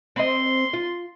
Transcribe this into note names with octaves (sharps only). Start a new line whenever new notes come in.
C4 D#5 C6
F4